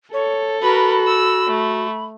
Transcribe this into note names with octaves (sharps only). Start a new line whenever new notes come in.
A4 C#5
F#4 A#4 B4 B5
E6
A3